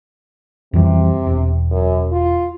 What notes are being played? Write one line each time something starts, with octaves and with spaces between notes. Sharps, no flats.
F2 C3 E3 G3
E1
F#2
F4